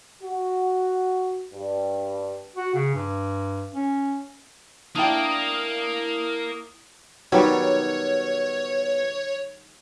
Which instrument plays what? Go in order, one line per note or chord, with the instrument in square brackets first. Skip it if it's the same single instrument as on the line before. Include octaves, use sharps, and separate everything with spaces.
[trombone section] F#4
G2
[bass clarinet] F#4
C#3
G2
C#4
[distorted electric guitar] A#3 [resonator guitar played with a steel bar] D4 D5 G5 [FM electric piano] E4 D#6
[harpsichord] B2 [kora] D#3 F#3 G3 [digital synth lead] C#5